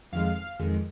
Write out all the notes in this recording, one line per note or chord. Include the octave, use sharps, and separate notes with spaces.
F2 D#3 G#3 F5
F5
F2 D#3 G#3